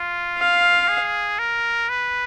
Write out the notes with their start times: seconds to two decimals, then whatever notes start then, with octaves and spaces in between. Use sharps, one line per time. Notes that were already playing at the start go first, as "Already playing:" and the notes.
Already playing: F4
0.38 F5
0.88 G#4
1.39 A#4
1.89 B4